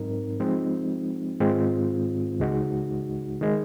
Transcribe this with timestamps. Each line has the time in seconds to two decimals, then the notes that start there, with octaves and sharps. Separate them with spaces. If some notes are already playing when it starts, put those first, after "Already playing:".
Already playing: G#2 F#3 C4 D#4 A#4
0.40 F3 G#3 C4 D#4
1.40 G#2 D#3 G#3 C4 F4
2.40 C#2 C#3 G#3 D#4 F#4
3.41 D#3 G#3